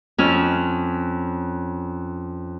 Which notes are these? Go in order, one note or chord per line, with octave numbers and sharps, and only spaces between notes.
F2 C#4 F6